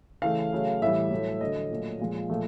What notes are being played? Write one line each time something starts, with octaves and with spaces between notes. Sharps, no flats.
C#3 E3 A3 F5
C#3 F#3 A3
A2 E3 G3 E5
A2 F#3 A3
D3 F#3 A3 D#5
A#2 F#3 A3
A#2 F3 G#3
A#2 F3 A3